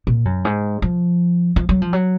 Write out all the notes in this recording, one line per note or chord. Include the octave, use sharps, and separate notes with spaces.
A#2
F#2
G#2
F3
F3
F#3
F3
F#3